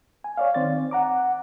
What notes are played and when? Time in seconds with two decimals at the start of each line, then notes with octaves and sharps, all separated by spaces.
0.24 G#5
0.37 C#5 D5 F5
0.55 D#3 C4 C5 D5 A6
0.91 F#5 A#5 D6